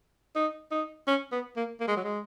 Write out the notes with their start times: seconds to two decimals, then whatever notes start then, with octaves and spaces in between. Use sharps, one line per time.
0.36 D#4
0.71 D#4
1.07 C#4
1.32 B3
1.56 A#3
1.80 A#3
1.88 G#3
1.96 F#3
2.04 G#3